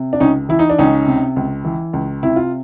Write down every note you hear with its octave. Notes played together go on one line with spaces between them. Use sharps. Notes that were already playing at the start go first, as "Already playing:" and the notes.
Already playing: C3
D4
C#2 C#4 D#4
E3 E4
D#4
D4
C#2 C#4 D#4
C3
C#2
E3
C#2
C3 E4
F4